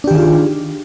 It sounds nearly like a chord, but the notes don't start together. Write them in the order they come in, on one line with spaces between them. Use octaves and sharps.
D4 G4 D#3 G#4 F4